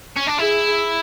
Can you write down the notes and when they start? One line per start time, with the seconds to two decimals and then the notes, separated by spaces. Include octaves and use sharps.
0.17 C#4
0.28 D4
0.39 E4 G#4